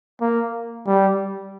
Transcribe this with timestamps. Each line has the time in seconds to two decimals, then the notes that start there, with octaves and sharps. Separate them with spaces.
0.21 A#3
0.87 G3